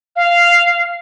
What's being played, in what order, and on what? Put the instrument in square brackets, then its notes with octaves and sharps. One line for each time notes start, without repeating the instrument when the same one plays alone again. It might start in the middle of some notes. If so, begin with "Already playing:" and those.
[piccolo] F5